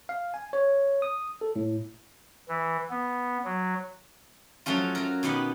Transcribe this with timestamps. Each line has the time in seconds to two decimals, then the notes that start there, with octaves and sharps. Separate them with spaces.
0.09 F5
0.34 G#5
0.53 C#5
1.02 D#6
1.41 A4
1.56 A2
2.49 E3
2.90 B3
3.45 F#3
4.66 F3 F#3 A3 C#4 F4
4.95 F#3 A#4
5.23 B2 D#3 G4 F#5 B5